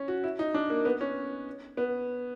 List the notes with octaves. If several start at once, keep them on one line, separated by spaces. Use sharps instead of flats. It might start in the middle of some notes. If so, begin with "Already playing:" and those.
Already playing: C#4
F#4
E4
D#4
D4
A#3
B3
C#4
B3